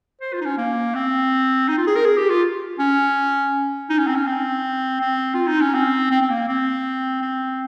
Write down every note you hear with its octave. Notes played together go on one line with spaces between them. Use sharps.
C5
F4
D#4
C#4
A#3
C4
D#4
F4
G#4
A#4
G#4
G4
F4
C#4
D#4
C#4
C4
C#4
C4
C4
F4
D#4
C#4
C4
C4
C4
A#3
C4
C4